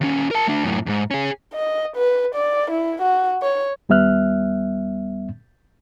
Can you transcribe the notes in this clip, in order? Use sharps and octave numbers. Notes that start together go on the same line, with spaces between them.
D#2 C#4
A#4 A5
A3 D4
F#2 A2
E2 G#2
C#4 G#4
D#5
B4
D5
E4
F#4
C#5
D#2 G3 B3 E5 F6 F#6